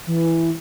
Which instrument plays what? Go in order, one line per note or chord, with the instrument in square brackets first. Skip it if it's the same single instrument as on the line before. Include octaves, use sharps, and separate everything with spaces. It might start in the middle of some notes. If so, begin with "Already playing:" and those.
[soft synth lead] E3